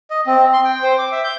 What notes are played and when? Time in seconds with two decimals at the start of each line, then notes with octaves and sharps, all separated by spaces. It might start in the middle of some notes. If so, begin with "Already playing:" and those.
0.10 D#5
0.27 C4
0.53 C6
0.65 G5
0.83 C5
0.98 D6
1.12 E5
1.24 G6